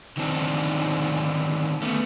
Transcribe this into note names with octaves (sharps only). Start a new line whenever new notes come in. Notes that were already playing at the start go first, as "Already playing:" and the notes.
D3 D#3 A3 C4 D4 D#4
A3 B3